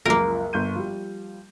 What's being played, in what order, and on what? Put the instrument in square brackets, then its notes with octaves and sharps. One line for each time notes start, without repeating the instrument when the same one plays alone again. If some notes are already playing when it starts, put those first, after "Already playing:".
[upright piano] C#2 F#2 F3 [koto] A#3 A#4
[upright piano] G1 G6 D#7
F3 G3